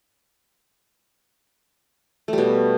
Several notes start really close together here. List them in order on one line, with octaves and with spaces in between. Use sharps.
A3 G3 B2